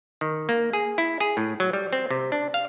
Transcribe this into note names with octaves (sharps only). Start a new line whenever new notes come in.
D#3
A#3
G#4
E4
G#4
A2
F#3
G3
C4
C3
D4
F5